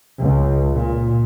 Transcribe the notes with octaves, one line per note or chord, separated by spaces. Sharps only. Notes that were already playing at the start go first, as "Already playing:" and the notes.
C#2
A#2